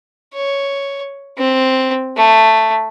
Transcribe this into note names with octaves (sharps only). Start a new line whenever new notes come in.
C#5
C4
A3